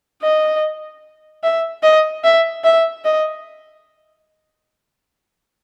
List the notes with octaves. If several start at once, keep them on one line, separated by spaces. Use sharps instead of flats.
D#5
E5
D#5
E5
E5
D#5